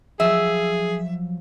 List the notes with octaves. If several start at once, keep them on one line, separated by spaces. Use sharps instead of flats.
F3 F#3 G#4 E5